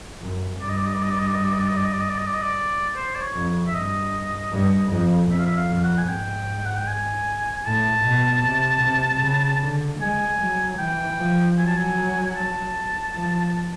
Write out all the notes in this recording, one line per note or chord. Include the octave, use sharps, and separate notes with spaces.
F#2
G2 D5
D#5
D5
D#5
D5
D#5
D5
D#5
D5
D#5
D5
D#5
D5
D#5
D5
D#5
D5
D#5
D5
D#5
D5
D#5
D5
C5
D5
C#5
F2
E5
G2 D#5
G2
F2
F2 E5
F5
E5
F5
F2 F5
F#5
G#5
G#2 G5
F#5
G5
G#5
A2 A5
B2
C3
C3
C#3
D3
G#3 G#5
F#3
E3 G5
F3
F#3 G#5
A5
G#5
A5
F3